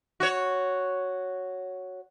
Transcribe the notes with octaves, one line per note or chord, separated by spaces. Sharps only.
F#4 C#5